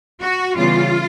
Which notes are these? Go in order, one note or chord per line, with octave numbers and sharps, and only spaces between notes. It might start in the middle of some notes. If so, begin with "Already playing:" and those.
F#4
C#3 E3 G3 B3 F4